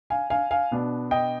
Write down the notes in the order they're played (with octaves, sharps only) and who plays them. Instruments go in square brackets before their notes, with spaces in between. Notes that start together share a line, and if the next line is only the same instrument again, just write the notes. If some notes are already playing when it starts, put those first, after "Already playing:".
[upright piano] F5 G#5
F5 G#5
F5 G#5
B2 B3 D4
D#5 G5